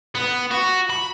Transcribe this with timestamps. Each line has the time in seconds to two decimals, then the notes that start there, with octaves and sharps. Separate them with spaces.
0.15 B3
0.51 F#4
0.90 B5